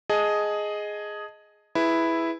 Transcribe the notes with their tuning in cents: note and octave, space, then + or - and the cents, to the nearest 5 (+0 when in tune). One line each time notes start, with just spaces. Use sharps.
G#4 +5 D#5 +0 A5 +0
E4 +0 G#4 +0 B4 +0